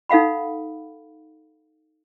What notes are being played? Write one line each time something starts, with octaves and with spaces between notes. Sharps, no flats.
D#4 A4 F5 F#5 B5